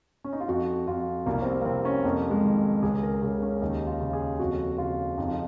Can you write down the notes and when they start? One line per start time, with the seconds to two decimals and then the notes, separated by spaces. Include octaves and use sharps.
0.24 C#4
0.33 D#4
0.40 F4
0.48 F2 F#4
0.87 F2 F4
1.26 C2 A#3
1.42 C4
1.46 A#3
1.61 A#3
1.65 C2 C4
1.85 C#4
2.04 F2 A#3
2.30 G#3
2.44 D#3
2.83 C#2 G#4
3.03 A#4
3.22 C#3 G#4
3.42 C#4
3.61 D#2 D#4
3.87 F4
4.01 C#3
4.13 G#4
4.39 F2 F#4
4.78 C#3 F4
5.18 F2 D#4
5.28 F4